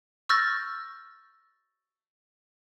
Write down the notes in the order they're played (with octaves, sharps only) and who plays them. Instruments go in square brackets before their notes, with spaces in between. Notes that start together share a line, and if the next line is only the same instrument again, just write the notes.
[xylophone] C#6 E6 F6 G6 A6 A#6